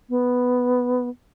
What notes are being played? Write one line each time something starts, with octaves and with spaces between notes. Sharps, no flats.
B3